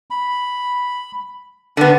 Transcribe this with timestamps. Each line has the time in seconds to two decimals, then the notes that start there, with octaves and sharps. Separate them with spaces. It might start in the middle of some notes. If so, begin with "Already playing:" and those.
0.10 B5
1.77 D3 B3 D4